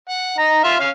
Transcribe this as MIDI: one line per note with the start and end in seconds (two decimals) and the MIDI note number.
0.09 0.35 78
0.38 0.61 63
0.38 0.61 82
0.64 0.77 65
0.64 0.77 76
0.64 0.77 77
0.80 0.89 61
0.80 0.89 77